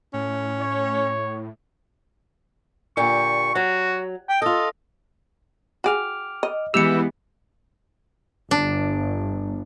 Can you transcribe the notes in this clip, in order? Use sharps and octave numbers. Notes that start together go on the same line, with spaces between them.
A2 C#4
C#5
A#2 D3 G4 C#6
F#3 F#4
G5
F4 A4 D#5
F#4 G#4 G5 D6 F6
D#5
E3 G#3 B3 G4 E6 G6 C#7
G1 D4